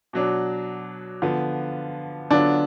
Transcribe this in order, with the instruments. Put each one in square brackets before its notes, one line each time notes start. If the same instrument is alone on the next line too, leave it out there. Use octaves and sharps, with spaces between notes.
[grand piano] B2 F#3 D4
D3 F3 B3
[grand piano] D3 F#3 B3 F4 [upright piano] D4